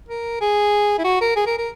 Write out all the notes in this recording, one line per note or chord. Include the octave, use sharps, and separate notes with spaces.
A#4
G#4
E4
F#4
A#4
G#4
A#4
A#4